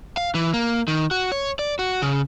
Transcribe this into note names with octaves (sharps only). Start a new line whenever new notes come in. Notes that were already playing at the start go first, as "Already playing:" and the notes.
F5
E3
A#3
D#3
F#4
C#5
D5
F#4
C#3